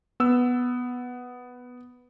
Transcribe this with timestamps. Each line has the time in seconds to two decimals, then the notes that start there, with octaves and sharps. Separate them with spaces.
0.20 B3 E6